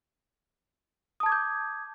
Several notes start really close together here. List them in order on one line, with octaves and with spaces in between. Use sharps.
D#6 A5 G#6 D6 G6